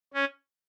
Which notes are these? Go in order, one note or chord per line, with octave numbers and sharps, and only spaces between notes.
C#4